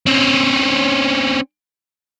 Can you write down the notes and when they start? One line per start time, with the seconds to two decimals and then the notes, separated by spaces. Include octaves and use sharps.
0.06 C4 C#4